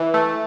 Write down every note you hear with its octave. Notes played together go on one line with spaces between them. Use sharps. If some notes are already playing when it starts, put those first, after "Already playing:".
Already playing: E3
A3